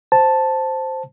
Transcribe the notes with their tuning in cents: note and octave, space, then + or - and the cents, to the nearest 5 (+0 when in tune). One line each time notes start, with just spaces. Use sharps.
C5 +0 A5 +0